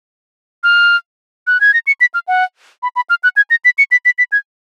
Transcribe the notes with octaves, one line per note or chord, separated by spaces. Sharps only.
F6
F#6
G#6
A#6
C#7
B6
F6
F#5
B5
B5
F6
F#6
G#6
A#6
B6
C#7
B6
B6
B6
G#6